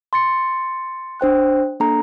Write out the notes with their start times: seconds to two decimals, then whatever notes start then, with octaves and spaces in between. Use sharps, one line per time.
0.13 C6 A6 C#7
1.20 D4 C5 G5 F#6
1.80 A#3 D4 A4 A#5